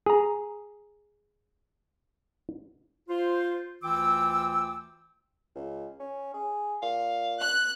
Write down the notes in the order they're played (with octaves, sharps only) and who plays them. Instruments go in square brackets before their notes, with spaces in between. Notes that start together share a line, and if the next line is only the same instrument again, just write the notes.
[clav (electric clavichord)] G#4 A#5
[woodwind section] F4 C5
D2 E3 F4 G5 D6 E6
[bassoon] C#2
C#4
G#4
[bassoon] A#2 [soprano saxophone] F5
[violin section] F#6